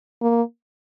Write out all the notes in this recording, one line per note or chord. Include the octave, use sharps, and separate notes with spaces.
A#3